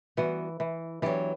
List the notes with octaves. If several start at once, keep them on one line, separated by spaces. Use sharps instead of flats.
E3 G3 B3 F#4
E3
E3 F#3 B3 D4 G4